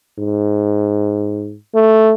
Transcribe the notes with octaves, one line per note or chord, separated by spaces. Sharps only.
G#2
A3